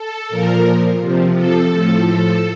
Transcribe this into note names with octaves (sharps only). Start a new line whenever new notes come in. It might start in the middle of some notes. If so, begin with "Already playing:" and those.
Already playing: A4
A#2 F3 A#4
C3 F3
A4
A2 F3
A4